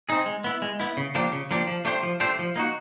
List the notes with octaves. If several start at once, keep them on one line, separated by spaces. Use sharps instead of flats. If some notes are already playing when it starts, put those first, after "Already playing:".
C4 D#4 G#4
G#3
B3 E4
G#3
B3 E4
C#3
F3 A#3 D4 G4
C#3
F3 A#3 D4 G4
F3
A3 D4 G4 C5
F3
A3 D4 G4 C5
F3
A#3 D#4 F#4